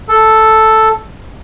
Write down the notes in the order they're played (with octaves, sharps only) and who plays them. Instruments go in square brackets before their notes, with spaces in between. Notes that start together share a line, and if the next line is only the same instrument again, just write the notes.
[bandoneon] A4